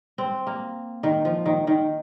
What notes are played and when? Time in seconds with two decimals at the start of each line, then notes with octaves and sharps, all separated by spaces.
0.18 C4
0.47 A#3
1.03 D#3
1.25 F3
1.46 D#3
1.67 D#3